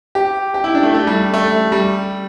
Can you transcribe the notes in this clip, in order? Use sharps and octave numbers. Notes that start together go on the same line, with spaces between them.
G4
G4
E4
D4
A3
A3
G3
A3
G3